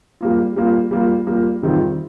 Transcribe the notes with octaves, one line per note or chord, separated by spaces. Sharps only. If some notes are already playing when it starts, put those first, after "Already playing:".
G3 A#3 F4
G3 A#3 F4
G3 A#3 F4
G3 A#3 F4
C3 D#3 G3 C4 F4